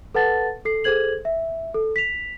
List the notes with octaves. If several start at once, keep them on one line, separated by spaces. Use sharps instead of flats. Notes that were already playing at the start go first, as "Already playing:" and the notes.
A4 B4 F#5 A5 A6
A4 C7
G#4 A4 C5 G#6 F#7
E5
A4
B6 F7